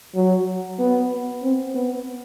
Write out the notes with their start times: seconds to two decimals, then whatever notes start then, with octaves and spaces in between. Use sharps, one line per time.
0.16 F#3
0.79 B3
1.43 C4
1.74 B3